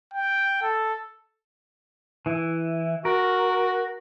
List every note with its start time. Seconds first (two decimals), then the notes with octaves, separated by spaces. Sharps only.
0.14 G5
0.62 A4
2.26 E3 E4
3.05 F#4 A#4